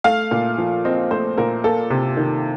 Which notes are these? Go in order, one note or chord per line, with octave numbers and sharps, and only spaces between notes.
A3 F5
A#2
F3
C4 D#5
A3 C5
A#2 A#4
A#3 A4
C3
D#3